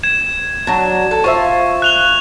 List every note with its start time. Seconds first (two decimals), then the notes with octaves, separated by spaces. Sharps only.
0.03 G#6 E7
0.67 F#3 D4
1.11 A4
1.24 F4 C5 E5 C#6
1.82 F#6 F7 G7